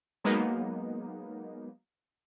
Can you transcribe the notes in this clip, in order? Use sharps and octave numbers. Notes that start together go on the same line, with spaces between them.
F#3 G#3 A#3 B3 D#4